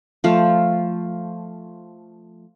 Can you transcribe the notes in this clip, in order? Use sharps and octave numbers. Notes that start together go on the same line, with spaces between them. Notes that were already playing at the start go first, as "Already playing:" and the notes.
F3 A3 F5